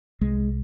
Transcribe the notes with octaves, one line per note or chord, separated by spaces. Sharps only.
C2 G#3